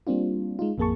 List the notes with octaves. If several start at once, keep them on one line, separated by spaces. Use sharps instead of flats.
G3 A#3 C4 D4 F4
G#3 D#4 F4
A1 F2 A#3 G#4 A5 C#6